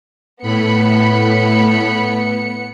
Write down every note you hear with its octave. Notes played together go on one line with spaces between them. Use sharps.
A2 B3 B5 C#7